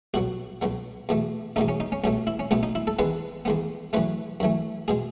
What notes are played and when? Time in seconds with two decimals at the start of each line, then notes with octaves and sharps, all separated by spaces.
0.14 C#2 B2 F#3 F#4
0.62 C#2 B2 F#3
1.09 E2 B2 A3
1.56 E2 B2 A3 D#4
1.68 C#4
1.80 D#4
1.92 C#4
2.04 C#2 B2 A3 C#4
2.27 E4
2.39 C#4
2.51 C#2 B2 A3 B3
2.63 D#4
2.75 E4
2.87 A4
2.99 E2 D#3 G#3 B3 B4
3.45 E2 D#3 G#3 B3
3.93 F#2 E3 A3 B4
4.40 F#2 E3 A3
4.88 B2 G#3 G#4